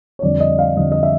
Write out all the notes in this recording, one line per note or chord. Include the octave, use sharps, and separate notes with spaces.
C#5
F2 D3 G3 D5
D#5
F5
F2 D3 G3 D#5
D#5
E5